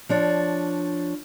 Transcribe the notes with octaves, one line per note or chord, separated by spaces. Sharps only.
F3 D4 C#5